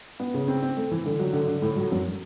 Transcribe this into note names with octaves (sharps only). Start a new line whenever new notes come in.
B3
C#3
C4
C4
A3
E3
D3
F#3
D3
D3
A2
F#3
F#2